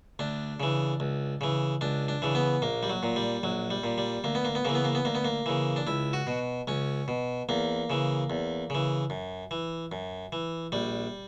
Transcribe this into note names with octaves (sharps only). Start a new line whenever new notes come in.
D2 D4
C#3 E3
C#2
C#3 E3
C#2 D4
D4
C#3 E3
B3
A#1 A#3
G3
F#3
A#2
G3
A#1 F#3
G3
A#2
G3
D2 A#3
B3
A#3
B3
C#3 E3 A#3
B3
A#3
B3
D2 A#3
B3
A#3
C#3 E3
D4
C#2 E4
F#4
B2
C#2 C#4
B2
E2 A#3
C#3 E3
E2
C#3 E3
F#2
E3
F#2
E3
A#1 G3